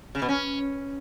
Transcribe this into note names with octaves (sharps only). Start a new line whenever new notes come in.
C#3
B2
C#4